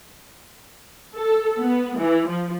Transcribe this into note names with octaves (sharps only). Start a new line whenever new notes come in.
A4
B3
E3
F3